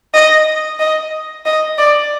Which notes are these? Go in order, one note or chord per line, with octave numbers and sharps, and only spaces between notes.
D#5
D#5
D#5
D5